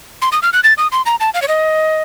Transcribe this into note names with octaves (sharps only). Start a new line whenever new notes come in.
C6
D#6
F6
F#6
A6
D#6
C6
A#5
A5
F5
C#5
D#5